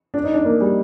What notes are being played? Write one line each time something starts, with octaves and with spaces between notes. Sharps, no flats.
D4
D#4
D4
A#3
G3